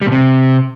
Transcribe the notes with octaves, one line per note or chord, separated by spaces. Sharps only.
G3
A#2
C3